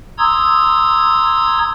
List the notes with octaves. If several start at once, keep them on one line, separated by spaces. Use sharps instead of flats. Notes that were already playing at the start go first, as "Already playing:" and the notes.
A#5 C6 D#6 E6 G#6